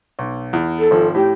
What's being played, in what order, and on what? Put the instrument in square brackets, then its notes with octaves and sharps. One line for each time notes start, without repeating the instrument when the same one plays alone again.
[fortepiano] B1
E2
[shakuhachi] A4
[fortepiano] G#1 F3
[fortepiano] A2 [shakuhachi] G4